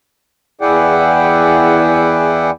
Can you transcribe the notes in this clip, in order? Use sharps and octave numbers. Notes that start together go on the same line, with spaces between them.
E2 E4 G#4 D5 F#5 G5